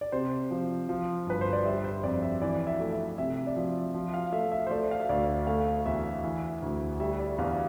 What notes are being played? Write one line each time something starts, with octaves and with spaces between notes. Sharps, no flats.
D5
C3 C5
F3
F3
G1 B4
C5
D5
G3 E5
C5
F2 D5
E5
E3 D5
E5
A3
E5
C3 E5
D5
F3 E5
F3
F5
A3 E5
E5
C5
A3 D5
F5
E5
D2 D5
A3 F5
E2 E5
E3 E5
D2
G3 E5
D5
E2 F5